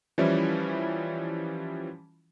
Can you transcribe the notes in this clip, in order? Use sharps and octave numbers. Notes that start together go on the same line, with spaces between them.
E3 F3 G3 C#4 E4